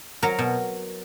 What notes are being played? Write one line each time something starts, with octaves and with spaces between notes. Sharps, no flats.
F#3 A#4
B2